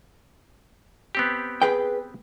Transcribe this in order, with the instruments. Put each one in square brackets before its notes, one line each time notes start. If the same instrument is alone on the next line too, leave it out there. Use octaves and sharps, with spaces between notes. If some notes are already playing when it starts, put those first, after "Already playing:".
[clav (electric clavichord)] B3 C4 G4
[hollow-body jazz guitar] G#4 B4 G5